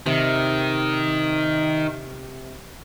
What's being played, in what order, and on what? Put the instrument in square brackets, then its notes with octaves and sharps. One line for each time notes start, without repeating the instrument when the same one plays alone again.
[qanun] C3 [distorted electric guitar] D#3